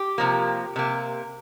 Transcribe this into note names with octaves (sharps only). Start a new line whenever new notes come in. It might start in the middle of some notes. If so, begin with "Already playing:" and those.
Already playing: G4
C3 F3 A#3
C3 A#3